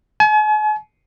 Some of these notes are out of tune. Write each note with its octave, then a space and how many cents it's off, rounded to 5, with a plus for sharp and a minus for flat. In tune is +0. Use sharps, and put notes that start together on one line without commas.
G#5 +45